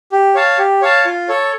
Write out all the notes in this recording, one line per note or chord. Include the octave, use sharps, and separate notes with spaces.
G4
C#5 F5 A5
G4
C#5 F5 A5
F4
A4 C#5